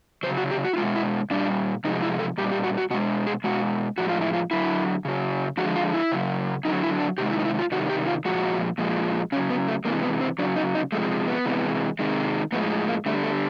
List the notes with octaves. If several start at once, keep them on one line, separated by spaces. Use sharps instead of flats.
C#3 F#3 C5
F#4
G4
F#4
E4
B2 G#3 F4
E4
A#2 G3 D4
C3 F3 G#3 D#4
E4
A4
A#2 G3 G4
G4
F#4
F#4
B2 G#3 F#4
G#4
B2 G#3 F#4
A2 F3 G#3 F#4
F4
E4
F4
D3 F#3 E4
C#3 F#3
D3 F3 G#3 F#4
F4
E4
C#3 F#3
D3 F#3 D#4
E4
D4
C3 D#3 G#3 G4
E4
D#4
E4
F4
C3 D#3 G3 F#4
G4
F4
A#2 F3 G#3 F#4
A#2 F3 G#3
C#3 F#3 C#4
B3
A3
C3 E3 G#3 A#3
B3
C4
C#3 F#3 D4
D#4
D#4
C3 F3 G#3 A3
B3
C3 E3 G#3
C3 D#3 G#3
A2 F3 G#3 B3
A#3
D3 G3 A3
A3